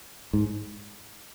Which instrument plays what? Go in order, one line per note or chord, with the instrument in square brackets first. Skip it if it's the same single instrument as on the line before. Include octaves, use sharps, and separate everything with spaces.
[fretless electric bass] G#2